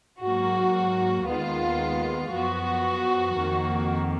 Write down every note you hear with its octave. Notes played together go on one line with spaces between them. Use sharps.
G#2 F#3 A#3 F#4
D#2 D#3 G#3 B3 F4
F#2 F3 B3 F#4
F2 D#3 A#3